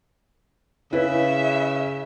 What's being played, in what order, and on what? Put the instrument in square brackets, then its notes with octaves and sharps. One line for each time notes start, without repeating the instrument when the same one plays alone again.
[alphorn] C#3 [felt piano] E4 B4 [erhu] E5